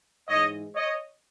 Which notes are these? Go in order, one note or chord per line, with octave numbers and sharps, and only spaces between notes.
G#2 E3 G#3 C#5 D#5
C#5 D#5